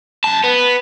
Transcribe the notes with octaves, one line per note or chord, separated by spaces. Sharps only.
F#2 A5
B3